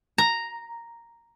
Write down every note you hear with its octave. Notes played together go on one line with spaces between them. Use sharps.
A#5